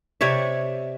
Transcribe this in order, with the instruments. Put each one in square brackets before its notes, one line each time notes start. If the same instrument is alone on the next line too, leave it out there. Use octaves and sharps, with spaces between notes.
[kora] C3 C#5 D5 E5